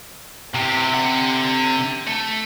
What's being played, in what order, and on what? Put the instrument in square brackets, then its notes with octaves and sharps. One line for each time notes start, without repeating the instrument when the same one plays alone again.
[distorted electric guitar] A2 G4 [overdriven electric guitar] C3
[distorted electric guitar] D3 F#5
A3